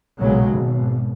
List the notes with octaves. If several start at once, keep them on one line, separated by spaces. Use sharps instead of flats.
B1 A#2 C#3 F#3 G#3
G#1 B2